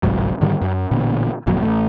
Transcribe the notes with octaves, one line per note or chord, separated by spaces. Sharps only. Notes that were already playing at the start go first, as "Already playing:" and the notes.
G1 C2 G#2 F#3
G#2 D3 D#3 G3
F#2
A1 A#2 D3 B3
G1 F2 A#2 F#3
A1 A#2 A3